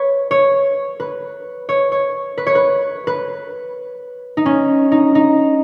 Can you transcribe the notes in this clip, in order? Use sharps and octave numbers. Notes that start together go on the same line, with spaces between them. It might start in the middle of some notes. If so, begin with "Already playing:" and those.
Already playing: B4 C#5
C#5
B4
C#5
C#5
B4
C#5
B4
B4
D#4
C#4
D#4
D#4